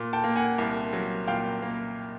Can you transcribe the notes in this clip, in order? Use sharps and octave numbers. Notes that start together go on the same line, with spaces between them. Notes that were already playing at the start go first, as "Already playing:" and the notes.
Already playing: A#2
G5 A5
A#3
F#5 G#5
C2
F#3
A#2 F5 G5
A#3